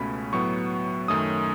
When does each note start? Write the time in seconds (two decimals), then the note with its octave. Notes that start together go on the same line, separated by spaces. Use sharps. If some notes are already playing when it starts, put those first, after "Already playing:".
Already playing: C#2 B2 A3 C#4 B5
0.33 A2 F#3 B3 C#6
1.08 F#2 D#3 A3 C#4 D#6